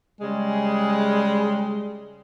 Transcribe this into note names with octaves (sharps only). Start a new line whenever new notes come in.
C#3 G3 G#3